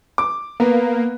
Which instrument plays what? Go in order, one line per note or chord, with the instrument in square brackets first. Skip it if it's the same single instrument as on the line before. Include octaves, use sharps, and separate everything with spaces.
[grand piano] D6
[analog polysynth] A#3 [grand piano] B3